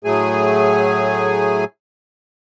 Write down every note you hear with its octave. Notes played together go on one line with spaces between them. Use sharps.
A2 F#3 A3 G#4 G#5